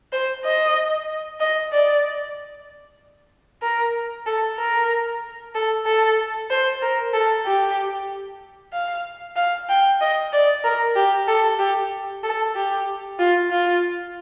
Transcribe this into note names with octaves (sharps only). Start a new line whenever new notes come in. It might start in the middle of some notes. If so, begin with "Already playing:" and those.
C5
D#5
D#5
D5
A#4
A4
A#4
A4
A4
C5
A#4
A4
G4
F5
F5
G5
D#5
D5
A#4
G4
A4
G4
A4
G4
F4
F4